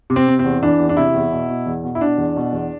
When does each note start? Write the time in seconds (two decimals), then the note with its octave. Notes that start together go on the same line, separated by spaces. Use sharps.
0.10 C3
0.16 C4
0.28 C3
0.39 C4
0.45 E2
0.63 E3 D4
0.80 E2
0.89 D4
0.97 C3 E4
1.15 E2
1.32 B2
1.49 B2
1.67 E2
1.84 B2
1.95 E4
2.01 B2 D4
2.18 E2
2.36 B2
2.53 E2